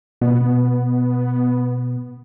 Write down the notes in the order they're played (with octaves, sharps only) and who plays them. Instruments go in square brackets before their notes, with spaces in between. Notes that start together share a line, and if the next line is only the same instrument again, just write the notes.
[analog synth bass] B2 [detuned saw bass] B3